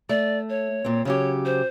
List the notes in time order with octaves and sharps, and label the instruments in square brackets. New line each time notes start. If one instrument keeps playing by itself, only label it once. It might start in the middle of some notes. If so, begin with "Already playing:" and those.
[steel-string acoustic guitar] A3 [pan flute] D5
[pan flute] C#5
[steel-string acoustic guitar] A#2 C4
[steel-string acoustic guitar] C#3 F#3 G4 [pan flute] C#5
[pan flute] C5